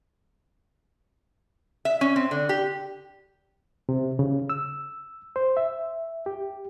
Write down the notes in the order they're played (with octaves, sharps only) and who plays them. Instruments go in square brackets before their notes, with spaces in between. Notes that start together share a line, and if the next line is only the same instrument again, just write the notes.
[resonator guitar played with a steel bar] E5
C#4
C4
D3
G4
[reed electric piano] C3
C#3
E6
C5
E5
G4